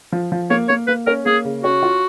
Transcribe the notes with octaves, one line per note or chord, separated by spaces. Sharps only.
F3
F3
A#3 C#5
A#3 C#5
A#3 B4
C#4 A#4
A#3 G#4
C#3
C#4 F#4
F4